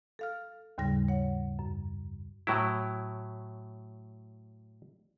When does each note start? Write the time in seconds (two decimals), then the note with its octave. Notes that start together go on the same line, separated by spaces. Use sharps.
0.19 A4 F5 F6
0.78 D#2 G#2 C#3 G3 A#6
1.08 C#5 F#5
1.59 F#2
2.47 A2 F#3 E4